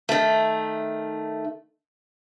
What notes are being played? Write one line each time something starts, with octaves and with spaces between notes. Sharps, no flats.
D#3 A3